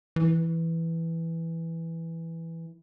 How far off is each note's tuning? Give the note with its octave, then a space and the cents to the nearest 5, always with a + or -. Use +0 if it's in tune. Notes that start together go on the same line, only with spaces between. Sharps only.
E3 +0